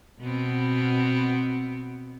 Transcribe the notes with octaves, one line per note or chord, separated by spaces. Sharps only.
B2 B3 C4